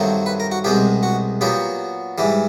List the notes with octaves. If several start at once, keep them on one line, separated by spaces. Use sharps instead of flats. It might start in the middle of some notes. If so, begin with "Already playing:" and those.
Already playing: G2 D#3 F#3 A3 C4
B4
A#4
F#4
C2 B2 G#3 C4 G4
F#4
A#2 F#3 B3 G4
G#2 E3 G3